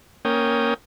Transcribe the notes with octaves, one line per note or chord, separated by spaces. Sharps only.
A#3 C#4 G5 D#6